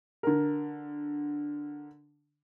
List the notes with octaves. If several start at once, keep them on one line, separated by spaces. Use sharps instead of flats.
D3 A#4